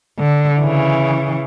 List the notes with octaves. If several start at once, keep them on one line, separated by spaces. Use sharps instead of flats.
D3
C#3 E3